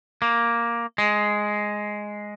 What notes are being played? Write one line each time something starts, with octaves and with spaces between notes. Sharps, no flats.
A#3
G#3